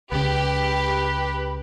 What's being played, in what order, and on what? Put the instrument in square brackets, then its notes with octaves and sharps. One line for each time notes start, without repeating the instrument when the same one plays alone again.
[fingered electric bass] C#2 C#3 [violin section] G4 [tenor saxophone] B4